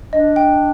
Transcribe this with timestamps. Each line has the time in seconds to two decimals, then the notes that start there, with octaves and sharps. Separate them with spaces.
0.13 D4 D#5
0.36 G5